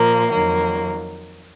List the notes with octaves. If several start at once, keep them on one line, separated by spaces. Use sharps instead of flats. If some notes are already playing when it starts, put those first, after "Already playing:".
Already playing: A#2 F3 A#3
F2 D#3 F#3 A#3